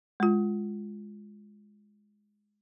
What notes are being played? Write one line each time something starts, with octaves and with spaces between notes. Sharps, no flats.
G#3 F4